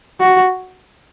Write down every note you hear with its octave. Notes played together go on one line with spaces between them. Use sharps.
F#4